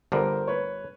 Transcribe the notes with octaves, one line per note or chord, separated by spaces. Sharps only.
G1 G2 D3 A#4 C5
B4 C#5